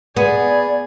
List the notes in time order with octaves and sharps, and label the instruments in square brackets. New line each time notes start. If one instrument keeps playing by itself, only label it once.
[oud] B3 [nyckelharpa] G#4 [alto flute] D5